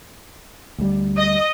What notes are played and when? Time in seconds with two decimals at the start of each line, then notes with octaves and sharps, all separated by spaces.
0.78 D2 G3
1.17 D#5